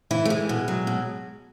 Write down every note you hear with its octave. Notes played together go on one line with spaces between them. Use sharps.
E3 E4
A3
E3 G#3
B2
F#3
B2